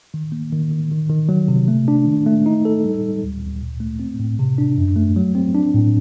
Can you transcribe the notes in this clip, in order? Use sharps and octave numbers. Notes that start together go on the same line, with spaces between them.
D#3
A#3
D#3
D#3
D#3
D#3
F#3
C3
A3
D4
D#3
A3
D#4
A4
G3
G3
D2
D2
A#2
A3
C4
A2
C3
D4
F#2
A3
F#3
C4
D4
A2